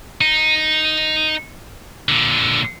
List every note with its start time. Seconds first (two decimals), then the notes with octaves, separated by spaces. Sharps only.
0.21 D#4
2.09 A#2 D3